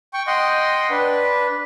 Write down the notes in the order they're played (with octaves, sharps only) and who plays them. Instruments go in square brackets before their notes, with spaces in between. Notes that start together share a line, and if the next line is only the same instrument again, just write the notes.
[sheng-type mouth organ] G5 C#6
D#5 F#5 G5 C6
D4 B4